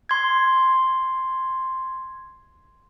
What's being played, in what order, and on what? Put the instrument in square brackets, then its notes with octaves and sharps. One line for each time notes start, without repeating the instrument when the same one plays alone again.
[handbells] C6 G#6